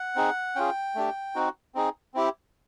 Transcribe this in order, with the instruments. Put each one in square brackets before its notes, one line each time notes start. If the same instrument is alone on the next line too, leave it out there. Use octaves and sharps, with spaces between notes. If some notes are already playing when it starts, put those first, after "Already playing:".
Already playing: [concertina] F#5
C4 D#4 G#4
C#4 F4 G#4 G5
A3 D4 G4
C4 D#4 F#4
C4 D#4 G#4
C4 E4 G4